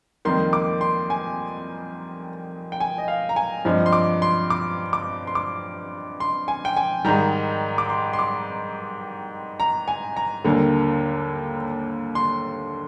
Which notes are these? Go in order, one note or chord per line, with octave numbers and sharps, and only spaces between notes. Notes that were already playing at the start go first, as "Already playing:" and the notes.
F2 D#3 G3 A#3 C6
D6
C6
G#5
G5
G#5
D#5
F5
A#5
G#5
G2 F3 G#3 C4
C6
D6
C6
D6
D6
C6
D6
C6
G#5
G5
G#5
G#2 D#3 G3 A#5
D6
C6
C6
D6
A#5
G#5
A#5
D#2 D3 G3 A#3
C6